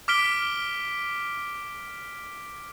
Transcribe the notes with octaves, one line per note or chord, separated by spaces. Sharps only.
D6 F6 B6 D7 G7